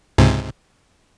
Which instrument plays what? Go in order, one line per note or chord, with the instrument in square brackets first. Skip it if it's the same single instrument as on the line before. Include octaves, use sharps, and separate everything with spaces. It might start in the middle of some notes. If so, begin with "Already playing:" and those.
[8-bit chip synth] C#2 G#2 C3